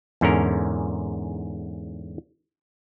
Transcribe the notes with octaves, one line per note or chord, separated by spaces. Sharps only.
E2 G#2 D3 C#4 A#4